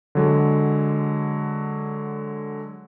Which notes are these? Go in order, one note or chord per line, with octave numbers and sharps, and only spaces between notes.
D3 F#3 G#3